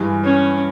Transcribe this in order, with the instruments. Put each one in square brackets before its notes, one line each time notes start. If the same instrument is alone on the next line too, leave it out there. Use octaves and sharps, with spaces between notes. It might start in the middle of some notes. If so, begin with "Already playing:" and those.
Already playing: [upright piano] G2 E3 G#3
[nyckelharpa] C#4